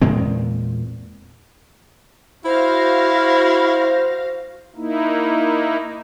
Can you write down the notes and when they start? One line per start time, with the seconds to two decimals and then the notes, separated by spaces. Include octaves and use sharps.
0.02 E2 A#2 G#3 C4
2.45 E4 F#4 C5 F5 A#6
4.76 A#3 D#4 E4